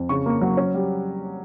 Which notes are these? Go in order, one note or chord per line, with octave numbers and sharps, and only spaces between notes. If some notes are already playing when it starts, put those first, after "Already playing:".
Already playing: F2
C#3 C#6
A#3
F#3
C#4
G3